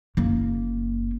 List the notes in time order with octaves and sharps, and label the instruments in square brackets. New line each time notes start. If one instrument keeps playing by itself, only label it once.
[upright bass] F#1 A#3